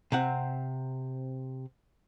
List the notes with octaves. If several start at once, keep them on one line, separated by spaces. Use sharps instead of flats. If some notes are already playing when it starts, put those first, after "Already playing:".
C3 C4 F#5